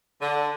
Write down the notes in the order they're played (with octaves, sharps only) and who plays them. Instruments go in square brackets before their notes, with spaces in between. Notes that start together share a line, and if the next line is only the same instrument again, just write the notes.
[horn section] D3